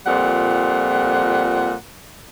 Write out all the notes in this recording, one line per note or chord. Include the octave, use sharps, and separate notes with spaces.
F2 A#2 G3 F#5